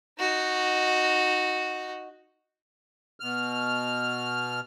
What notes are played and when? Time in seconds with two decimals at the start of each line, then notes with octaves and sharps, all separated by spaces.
0.19 D#4 F#4
3.20 B2 F6